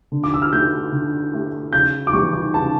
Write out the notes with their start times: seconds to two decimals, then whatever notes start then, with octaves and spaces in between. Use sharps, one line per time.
0.12 D3
0.24 D6
0.34 E6
0.42 F6
0.52 A3 E4 G4 G6
0.92 D3
1.33 A3 E4 G4
1.73 C#3 G6
2.07 D6
2.13 E3 G3 C#6
2.33 C#6
2.54 C#3 A5